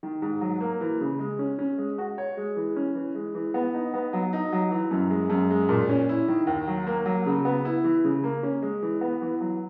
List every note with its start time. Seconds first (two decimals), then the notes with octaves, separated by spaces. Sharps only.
0.03 D#3
0.22 G#2
0.41 F#3
0.61 A#3
0.81 E3
1.01 C#3
1.19 G#3
1.39 C#4
1.59 C#4
1.78 G#3
1.98 F#4
2.18 C#5
2.37 G#3
2.57 E3
2.76 C#4
2.95 E3
3.15 G#3
3.35 E3
3.54 B3
3.74 D#4
3.94 B3
4.13 F#3
4.33 D#4
4.52 F#3
4.71 E3
4.91 F#2
5.10 G#3
5.30 F#2
5.50 G#3
5.69 A#2
5.89 C#4
6.09 E4
6.28 D#3
6.47 D#2
6.68 F#3
6.87 A#3
7.06 F#3
7.26 C#3
7.45 B3
7.65 E4
7.84 E3
8.04 C#3
8.24 A#3
8.43 C#4
8.62 G#3
8.83 E3
9.01 B3
9.22 E3
9.41 F#3